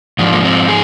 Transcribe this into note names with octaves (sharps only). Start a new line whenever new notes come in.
G#2 F3 D4
A#3
C4
G#4